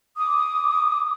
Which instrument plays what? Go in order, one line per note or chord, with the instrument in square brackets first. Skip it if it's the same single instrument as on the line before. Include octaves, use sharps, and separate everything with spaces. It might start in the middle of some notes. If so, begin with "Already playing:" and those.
[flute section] D6 D#6